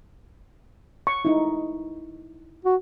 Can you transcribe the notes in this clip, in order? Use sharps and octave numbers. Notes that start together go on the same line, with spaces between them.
C#6
D#4 E4
F#4